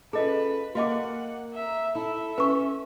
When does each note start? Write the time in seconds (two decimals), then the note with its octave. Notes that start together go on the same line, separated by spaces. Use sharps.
0.13 C#4 F4 G#4 A4 B4 D#5
0.75 A#3 F#4 A#4 D#5 F#5 G#5 D6
1.54 E5 A#5
1.95 E4 A4 E5
2.38 C#4 B4 C#6